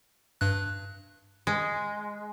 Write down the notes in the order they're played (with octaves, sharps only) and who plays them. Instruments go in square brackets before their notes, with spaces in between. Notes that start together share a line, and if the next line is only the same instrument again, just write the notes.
[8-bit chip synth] G2 F#6
[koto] G#3